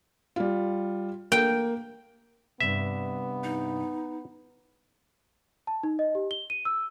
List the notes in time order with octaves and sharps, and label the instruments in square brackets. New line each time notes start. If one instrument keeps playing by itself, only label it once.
[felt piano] G3 F4
[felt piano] A#3 [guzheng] G5
[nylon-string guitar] G2 C3 [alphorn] B3 [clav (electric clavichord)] E5
[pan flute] D#4
[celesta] A5
D#4
D#5
G4
G7
D#7
E6